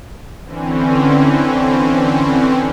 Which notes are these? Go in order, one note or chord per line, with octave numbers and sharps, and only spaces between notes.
D3 E3 C4 C#4